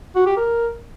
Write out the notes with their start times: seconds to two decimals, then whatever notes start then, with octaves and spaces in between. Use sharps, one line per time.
0.16 F#4
0.26 G4
0.37 A#4